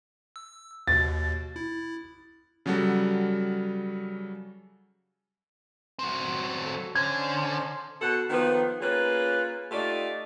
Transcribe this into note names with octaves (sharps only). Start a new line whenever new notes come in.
E6
D#2 B2 A6
E4
C#3 F#3 G3 F#4 A4
F#3 C4
A4
D3 C#4 C5 C6 G#6
B2 A4 F#5
D#3 F3 A#3 B3
A#3 C#4 F4 G#4 B4
A3 D#4 F4 G4 D5